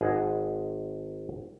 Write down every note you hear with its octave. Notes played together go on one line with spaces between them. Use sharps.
G#1 G#4 D#5 F#5